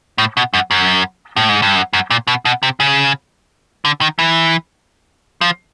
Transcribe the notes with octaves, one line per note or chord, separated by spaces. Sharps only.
A2
B2
F#2
F#2
A2
G#2
G2
F#2
F#2
A#2
B2
B2
C3
C#3
D3
D#3
E3
F3